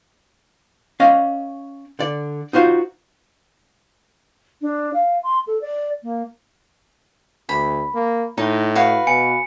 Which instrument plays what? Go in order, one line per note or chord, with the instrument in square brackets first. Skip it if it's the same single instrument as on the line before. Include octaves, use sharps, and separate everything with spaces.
[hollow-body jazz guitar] C#4 D5 D#5 F5
D3 D5
D#4 F4 F#4 C5
[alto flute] D4
F5
C6
A4
D5
A#3
[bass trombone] D2 [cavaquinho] B5
[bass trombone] A#3
[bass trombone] A2 [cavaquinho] D#4
[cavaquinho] F#4 B4 F5
[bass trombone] B2 [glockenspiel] G#5 C#7